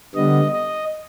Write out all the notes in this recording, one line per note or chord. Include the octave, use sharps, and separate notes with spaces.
D3 G3 B3 D#5
D#5